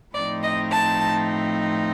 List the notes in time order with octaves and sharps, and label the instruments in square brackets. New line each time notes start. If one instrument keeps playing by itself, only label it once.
[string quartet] A2 F3 C4 D#4 D5
D#5
A5